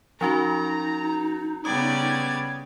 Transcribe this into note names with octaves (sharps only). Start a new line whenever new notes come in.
F3 C#4 D#4 F#4 A#5
C#3 G3 B3 D5 D#6 G#6